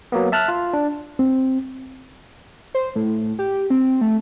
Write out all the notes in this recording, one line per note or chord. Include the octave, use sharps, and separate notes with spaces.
F#3 A#3 B3
E5 A5 F6 F#6
F4
D4
C4
C5
A2
G4
C4
A3